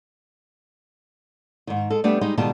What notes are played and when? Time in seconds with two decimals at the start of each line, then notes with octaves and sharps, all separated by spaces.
1.67 G#2 D#3
1.90 G#3 A4
2.04 G3 A3 B3 D4 G4
2.21 G3 G#3 D#4
2.38 B2 D#3 G3 G#3 F4 A5